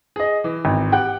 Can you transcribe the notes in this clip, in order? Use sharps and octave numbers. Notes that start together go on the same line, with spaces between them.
G#4 D#5
E3
G#1
G4 F#5 G5